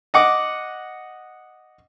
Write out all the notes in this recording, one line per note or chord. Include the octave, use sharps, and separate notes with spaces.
D#5 F#5 D6